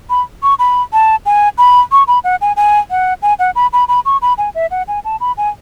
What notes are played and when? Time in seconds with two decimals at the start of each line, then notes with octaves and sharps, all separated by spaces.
0.10 B5
0.43 C#6
0.59 B5
0.93 A5
1.26 G#5
1.58 B5
1.92 C#6
2.08 B5
2.24 F#5
2.41 G#5
2.57 G#5
2.91 F#5
3.22 G#5
3.39 F#5
3.56 B5
3.73 B5
3.88 B5
4.06 C#6
4.22 B5
4.38 G#5
4.55 E5
4.71 F#5
4.88 G#5
5.05 A5
5.21 B5
5.37 G#5